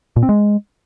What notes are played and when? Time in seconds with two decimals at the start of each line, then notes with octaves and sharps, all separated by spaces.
0.16 A#2
0.23 C4
0.29 G#3